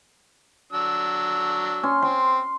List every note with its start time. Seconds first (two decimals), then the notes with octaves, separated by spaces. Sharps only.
0.72 F#3 D4 E6
1.83 C#4 C6
2.02 C4 C6